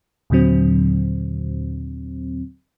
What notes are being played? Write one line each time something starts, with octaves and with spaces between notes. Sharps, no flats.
D#2 A#2 D3 F#3 C4